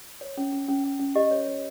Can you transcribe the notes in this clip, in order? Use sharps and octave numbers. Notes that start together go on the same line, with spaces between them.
C#5
C#4
C#4
C#4
C#4
C#4
G4 D#5
C#5
C#5